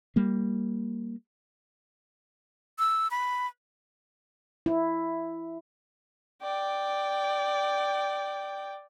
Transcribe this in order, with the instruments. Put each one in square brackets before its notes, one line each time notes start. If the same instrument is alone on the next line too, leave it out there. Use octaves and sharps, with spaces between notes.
[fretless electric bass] G3 A#3
[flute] E6
B5
[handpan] E4
[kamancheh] D5 G5